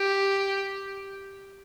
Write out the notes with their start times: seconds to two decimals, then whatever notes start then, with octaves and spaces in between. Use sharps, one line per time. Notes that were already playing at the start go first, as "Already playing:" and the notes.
Already playing: G4